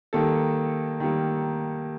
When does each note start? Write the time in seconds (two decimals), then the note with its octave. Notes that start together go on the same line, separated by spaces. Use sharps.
0.13 D#3 G3 A#3 A4
1.00 D#3 G3 A#3